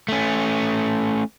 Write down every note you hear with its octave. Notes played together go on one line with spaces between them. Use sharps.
A3 C#4